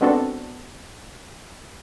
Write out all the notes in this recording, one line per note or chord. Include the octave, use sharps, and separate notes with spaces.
G#3 B3 C4 D4 F#4 A4